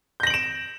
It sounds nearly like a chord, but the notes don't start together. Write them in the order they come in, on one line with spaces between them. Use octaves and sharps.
G6 A#6 F#7 D7 E7